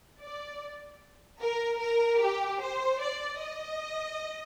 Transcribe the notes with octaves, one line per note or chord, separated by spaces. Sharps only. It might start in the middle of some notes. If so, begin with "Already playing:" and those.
D5
A#4
A#4
G4
C5
D5
D#5